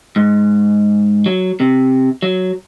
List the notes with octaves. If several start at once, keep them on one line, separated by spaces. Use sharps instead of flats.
G#2
F#3
C3
F#3